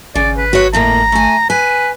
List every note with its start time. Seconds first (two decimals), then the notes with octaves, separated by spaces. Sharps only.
0.15 G#1 C#3 D5
0.37 B4
0.53 F#4 C#5
0.73 F2 A2 A#3 A#5
1.12 A3 G#5
1.50 B4 G#5